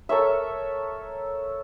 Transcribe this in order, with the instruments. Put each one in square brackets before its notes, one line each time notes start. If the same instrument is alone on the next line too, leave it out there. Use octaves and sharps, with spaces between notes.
[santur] A4 A#4 C#5 E5